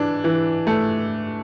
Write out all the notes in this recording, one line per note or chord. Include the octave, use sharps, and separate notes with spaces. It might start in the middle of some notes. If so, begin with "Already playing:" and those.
Already playing: E3 D4
E3
A3